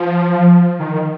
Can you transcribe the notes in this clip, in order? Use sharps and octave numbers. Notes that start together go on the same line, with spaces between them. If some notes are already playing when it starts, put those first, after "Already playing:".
Already playing: F3
D#3